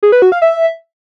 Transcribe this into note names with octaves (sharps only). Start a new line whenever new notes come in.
G#4
B4
F#4
F5
E5